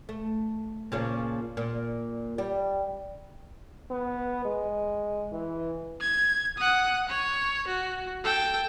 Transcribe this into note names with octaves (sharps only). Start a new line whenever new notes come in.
A3
A#2 C#3 F3
A#2
G3
B3
G#3
E3
G#6
F#5 D#6
C#5
F#4
A4 G5